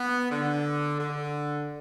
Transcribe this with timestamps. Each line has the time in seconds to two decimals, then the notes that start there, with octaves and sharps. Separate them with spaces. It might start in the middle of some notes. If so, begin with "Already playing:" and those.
Already playing: B3
0.31 D3
0.99 D3